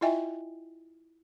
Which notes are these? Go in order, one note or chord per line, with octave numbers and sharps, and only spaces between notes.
E4 F4 D#5 E5 G5 G#5